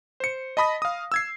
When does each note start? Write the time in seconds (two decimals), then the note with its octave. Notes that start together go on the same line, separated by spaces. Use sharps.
0.20 C5 C#7
0.57 D#5 A5 B5 D#6 A#6
0.82 F5 D#6
1.12 E6 G#6 C7